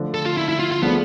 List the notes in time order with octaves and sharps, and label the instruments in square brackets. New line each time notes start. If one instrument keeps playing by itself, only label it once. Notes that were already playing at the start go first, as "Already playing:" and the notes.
Already playing: [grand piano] D3 F3 A3
[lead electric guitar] A4
F4
E4
E4
F4
F4
[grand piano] F3 A3 D4 G#4 [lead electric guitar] B3